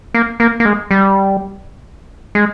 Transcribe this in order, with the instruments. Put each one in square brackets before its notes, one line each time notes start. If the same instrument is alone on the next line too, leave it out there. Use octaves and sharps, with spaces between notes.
[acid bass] A#3
A#3
A#3
G#3
G3
G#3